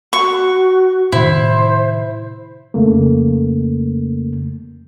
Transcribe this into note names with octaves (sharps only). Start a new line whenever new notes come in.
F#4 C#6
A2 C3 D#3 E4 C5
F2 C#3 A3 A#3